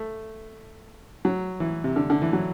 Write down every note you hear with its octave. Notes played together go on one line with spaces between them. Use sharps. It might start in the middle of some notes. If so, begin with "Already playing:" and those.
Already playing: A3
F#3
E3
C3
D3
D3
E3
F#3